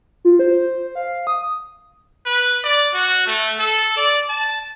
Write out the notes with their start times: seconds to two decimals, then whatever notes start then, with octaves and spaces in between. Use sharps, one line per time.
0.25 F4
0.39 C5
0.95 F5
1.27 D#6
2.26 B4
2.64 D5
2.94 F#4
3.27 A3
3.59 A4
3.97 D5
4.29 A5